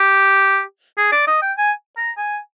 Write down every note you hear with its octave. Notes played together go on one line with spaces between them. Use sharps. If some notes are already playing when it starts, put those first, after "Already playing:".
Already playing: G4
G#4
D5
D#5
G5
G#5
A#5
G#5